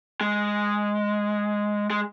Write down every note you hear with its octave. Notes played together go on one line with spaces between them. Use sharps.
G#3
G#3